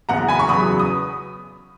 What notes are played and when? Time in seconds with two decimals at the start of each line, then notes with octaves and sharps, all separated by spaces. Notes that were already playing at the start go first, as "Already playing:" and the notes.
0.09 F#1 E2 B2 F#5 A#5
0.28 G#5 B5
0.39 C#6
0.49 E2 C#3 F#3 B3 B5 D#6
0.80 D#6